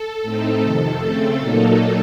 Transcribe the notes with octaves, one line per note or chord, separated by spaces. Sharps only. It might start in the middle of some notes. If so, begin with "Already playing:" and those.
Already playing: A4
A2 A3 C4 D#4
F2 C3 D#3 A4
C#3 A3 C4 A4
A#2 F#3 A#3 D#4